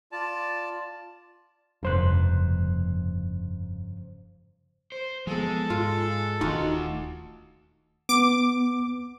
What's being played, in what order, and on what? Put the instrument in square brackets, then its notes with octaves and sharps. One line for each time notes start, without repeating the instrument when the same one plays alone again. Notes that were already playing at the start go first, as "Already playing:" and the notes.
[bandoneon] F4 D5 A5
[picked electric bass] F1 [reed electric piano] G2 C5 F#6 [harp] C#3 F3 A#3
[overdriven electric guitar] C5
[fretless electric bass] F3 B3 [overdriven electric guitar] G#3 [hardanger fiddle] A4
[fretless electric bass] G#2 [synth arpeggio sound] F4
[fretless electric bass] D#1 D#3 [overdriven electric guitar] A3 F#5 [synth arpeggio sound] D#4 F4 F#4
[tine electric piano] B3 [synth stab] D6